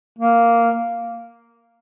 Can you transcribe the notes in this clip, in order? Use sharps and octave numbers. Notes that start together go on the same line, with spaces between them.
A#3